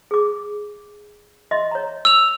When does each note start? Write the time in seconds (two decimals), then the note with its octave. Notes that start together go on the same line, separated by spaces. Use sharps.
0.11 G#4 D6
1.51 D#5 E5 C6
1.71 C#5 A#5
2.05 E6 F7